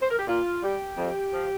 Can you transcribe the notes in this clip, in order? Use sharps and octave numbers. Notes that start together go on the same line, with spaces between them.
C5
A#4
G4
A#2 F4
G3 G4
F2
F3